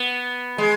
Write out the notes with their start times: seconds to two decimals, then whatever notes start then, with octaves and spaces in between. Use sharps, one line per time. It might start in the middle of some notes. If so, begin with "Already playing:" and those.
Already playing: B3
0.58 G#3